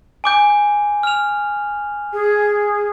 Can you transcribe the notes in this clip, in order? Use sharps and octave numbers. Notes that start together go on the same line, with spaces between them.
G#5 D6 G6
F6 F7
G#4